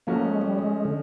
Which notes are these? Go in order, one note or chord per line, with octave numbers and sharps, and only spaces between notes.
F3 A3 A#3 C#4 F#4
G#3
G3
G#3
D3